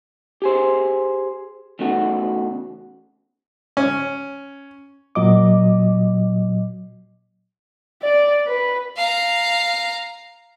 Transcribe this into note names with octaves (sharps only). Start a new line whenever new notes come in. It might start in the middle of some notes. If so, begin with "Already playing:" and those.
G4 G#4 C5
E2 C#3 A3 D#4 F#4
C#4
A#2 F#3 D#5 D6
D5
B4
F5 A#5